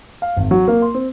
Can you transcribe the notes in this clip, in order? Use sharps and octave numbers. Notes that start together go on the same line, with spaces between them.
F5
G#1
F#3
A#3
C6
C4